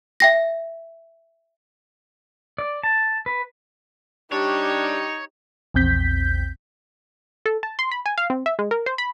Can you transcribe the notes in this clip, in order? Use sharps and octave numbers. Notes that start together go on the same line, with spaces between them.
E5 G5 A#6
D5
A5
B4
G3 D4 D#4 G4 C#5
A#1 E2 C4 G6 B6
A4
A5
C6
B5
G#5
F5
C4
E5
G#3
A#4
C5
B5